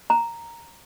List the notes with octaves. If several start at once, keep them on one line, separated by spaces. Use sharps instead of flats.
A#5